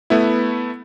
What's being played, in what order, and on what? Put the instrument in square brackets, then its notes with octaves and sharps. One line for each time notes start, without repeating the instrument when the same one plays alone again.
[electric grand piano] A3 B3 E4